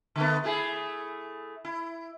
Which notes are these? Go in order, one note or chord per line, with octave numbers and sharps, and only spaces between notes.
D3 A3 B3
A3 E4 G#4
E4